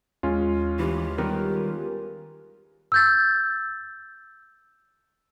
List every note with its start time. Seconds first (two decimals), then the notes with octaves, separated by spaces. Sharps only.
0.23 D#2 G#3 C#4 F4
0.79 D2 E3 G4
1.18 D#3 G3 B3 A#4
2.92 E6 G6 A6